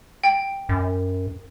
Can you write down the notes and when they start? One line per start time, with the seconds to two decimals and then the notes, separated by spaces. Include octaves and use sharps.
0.24 G5
0.69 F#2